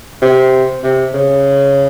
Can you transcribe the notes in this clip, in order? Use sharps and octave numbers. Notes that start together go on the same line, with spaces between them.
C3
C3
C#3